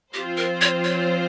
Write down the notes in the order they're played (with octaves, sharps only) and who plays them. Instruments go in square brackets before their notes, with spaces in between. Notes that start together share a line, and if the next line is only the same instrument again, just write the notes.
[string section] F3 C4 F4 C5 [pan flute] G4
[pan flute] A#4
C#5
C#5